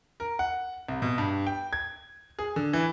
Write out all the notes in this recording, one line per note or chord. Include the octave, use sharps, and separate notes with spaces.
A#4
F#5
C2
B2
G2
G5
G#6
G#4
D3
E3